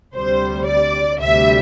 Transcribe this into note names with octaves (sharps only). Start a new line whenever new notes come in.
D2 C3 G3 C5
D5
D2 C3 G3 E5